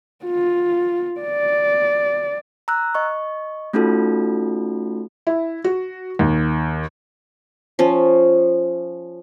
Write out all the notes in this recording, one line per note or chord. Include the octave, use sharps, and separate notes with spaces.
F4
D5
A#5 E6 F#6
D#5 C#6
A3 C#4 D#4 F4 F#4 A4
E4
F#4
D#2
F3 C#4